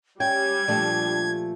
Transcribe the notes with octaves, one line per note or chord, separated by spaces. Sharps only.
G3 C#4 G5 G#6
A#2 F3 A3 D4